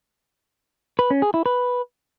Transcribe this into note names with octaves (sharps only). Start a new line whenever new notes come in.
B4
C#4
G#4
E4
B4